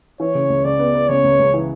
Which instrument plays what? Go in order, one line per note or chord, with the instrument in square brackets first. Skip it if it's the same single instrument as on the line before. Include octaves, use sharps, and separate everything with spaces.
[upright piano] E3 [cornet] C#5
[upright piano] C#3
C#2
[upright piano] C#3 [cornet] D5
[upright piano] B3
B3
[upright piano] C#3 [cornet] C#5
[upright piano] C#2
C#2
E3